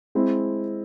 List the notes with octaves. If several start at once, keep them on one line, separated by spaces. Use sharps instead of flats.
G#3 C4 E4